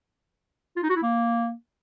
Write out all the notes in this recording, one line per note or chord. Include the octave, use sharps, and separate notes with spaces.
F4
D#4
F#4
E4
A#3